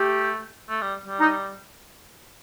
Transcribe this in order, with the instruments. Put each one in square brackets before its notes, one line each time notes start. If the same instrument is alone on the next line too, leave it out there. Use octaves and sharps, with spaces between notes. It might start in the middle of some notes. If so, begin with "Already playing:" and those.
Already playing: [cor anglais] A3 [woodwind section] G4
[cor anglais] A3
G3
G3
[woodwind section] D#4